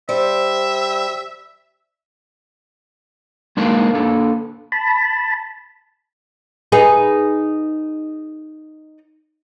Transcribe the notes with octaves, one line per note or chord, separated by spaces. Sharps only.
G3 C5 E5
G#3 A#3 D4 D#4 A#4 F5
A#3 D4 A4
A5 B5
D#4 G#4 B4